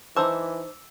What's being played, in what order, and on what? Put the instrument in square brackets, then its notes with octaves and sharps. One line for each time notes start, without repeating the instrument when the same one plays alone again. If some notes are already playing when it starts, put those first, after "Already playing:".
[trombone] E3 [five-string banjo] D#4 C5 A5 [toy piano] D6 E6